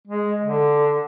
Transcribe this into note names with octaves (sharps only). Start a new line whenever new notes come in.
G#3
D3